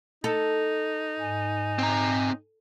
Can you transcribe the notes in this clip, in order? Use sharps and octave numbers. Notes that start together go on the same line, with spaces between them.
D#4 A4
G#2 G#5
C4 A#5